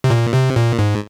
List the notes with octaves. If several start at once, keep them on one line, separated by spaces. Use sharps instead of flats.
C3
A#2
C3
A#2
G#2